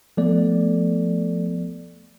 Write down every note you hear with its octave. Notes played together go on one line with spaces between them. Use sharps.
F3 A3 B3 A4 D5